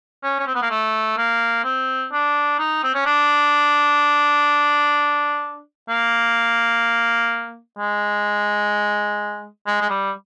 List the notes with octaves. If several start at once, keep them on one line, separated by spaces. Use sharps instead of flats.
C#4
C#4
C4
B3
A#3
A3
A#3
C4
D4
D#4
C4
C#4
D4
A#3
G#3
G#3
G#3
G3